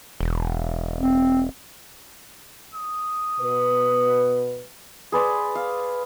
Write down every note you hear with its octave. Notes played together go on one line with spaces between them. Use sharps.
E1
C4
D#6
B2 B4
G#4 B4 D5 C6
F5